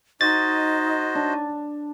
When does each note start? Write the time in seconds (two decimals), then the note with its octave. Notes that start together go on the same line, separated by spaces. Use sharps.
0.21 D#4 F#4 C5 D#5 A6
1.15 D4